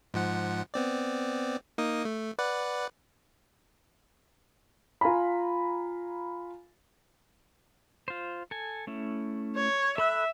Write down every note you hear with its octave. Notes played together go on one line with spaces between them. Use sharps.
G#2 F3 F#5
B3 C4 D5
A#3 D#4 D#6
A3
B4 D5 F#5
F4 F5 G#5 A#5 B5
F4 C5
A4 G#5
A3 C#4 E4
C#5
A4 E5 B5 F#6